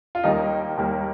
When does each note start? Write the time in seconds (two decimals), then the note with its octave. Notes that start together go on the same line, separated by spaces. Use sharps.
0.15 F4
0.23 D#2 D#3 G3 A#3 D#4
0.77 D#2 D#3 G3 A#3